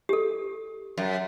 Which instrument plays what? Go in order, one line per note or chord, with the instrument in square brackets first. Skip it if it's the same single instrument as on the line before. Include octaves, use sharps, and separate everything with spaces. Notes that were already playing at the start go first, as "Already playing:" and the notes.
[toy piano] G4 A4
[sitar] F#2